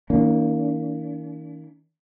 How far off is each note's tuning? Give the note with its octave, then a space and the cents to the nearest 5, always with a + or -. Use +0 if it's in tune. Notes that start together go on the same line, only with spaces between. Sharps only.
D#3 +40 A#3 -5 C#4 +45